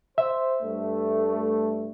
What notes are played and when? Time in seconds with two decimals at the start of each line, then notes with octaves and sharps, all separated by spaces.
0.18 C5 E5
0.61 G2 A3